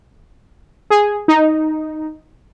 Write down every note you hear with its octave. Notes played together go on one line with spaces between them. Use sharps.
G#4
D#4